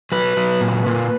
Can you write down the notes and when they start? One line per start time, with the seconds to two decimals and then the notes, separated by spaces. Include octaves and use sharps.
0.12 F#3 B4
0.37 F#3
0.61 A#2
0.87 A#2